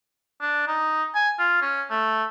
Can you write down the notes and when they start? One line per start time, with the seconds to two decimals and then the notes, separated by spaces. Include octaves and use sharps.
0.41 D4
0.67 D#4
1.14 G#5
1.39 F4
1.62 C#4
1.90 A3